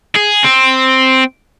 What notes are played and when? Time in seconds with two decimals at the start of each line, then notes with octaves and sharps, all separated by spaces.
0.15 G#4
0.44 C4